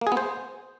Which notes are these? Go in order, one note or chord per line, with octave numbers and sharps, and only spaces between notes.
A#3
G#4
B3
C5